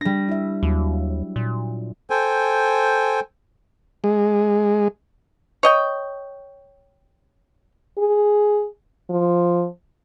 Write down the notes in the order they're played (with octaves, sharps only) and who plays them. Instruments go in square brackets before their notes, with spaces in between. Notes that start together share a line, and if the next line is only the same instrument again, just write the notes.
[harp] G3 A#6 [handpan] D4
[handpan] E4 E5
[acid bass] D#2 [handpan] F#3
[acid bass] A#2
[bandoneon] A4 C5 G5 G#5
[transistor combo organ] G#3
[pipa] C#5 D#5 G5
[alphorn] G#4
F3